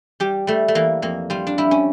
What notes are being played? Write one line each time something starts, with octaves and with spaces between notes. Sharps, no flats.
G3 G4
G3 A3
A3
E3 A#3
F2 A#3
G3 F4
D4
G3 E4
C#4